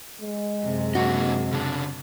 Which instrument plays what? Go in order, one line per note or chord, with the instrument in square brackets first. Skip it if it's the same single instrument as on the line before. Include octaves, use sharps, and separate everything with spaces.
[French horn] G#3
[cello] F#2 C3
[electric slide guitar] A#3 D4 D#5 [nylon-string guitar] F#4
[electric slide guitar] C#3 D4